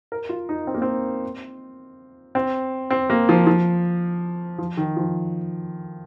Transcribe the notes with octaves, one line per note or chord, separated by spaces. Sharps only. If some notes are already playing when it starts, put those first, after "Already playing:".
A#4
F4
D#4
C4
A#3
C4
C4
C4
A#3
F3
F3
F3
D#3
F3